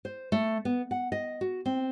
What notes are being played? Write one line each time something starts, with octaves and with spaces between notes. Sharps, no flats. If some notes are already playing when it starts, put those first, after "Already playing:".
C5
A3
B3
F#5
D#5
F#4
C4